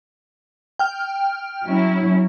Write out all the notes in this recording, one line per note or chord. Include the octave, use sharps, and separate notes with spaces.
G5 F6
F#3 C#4 E4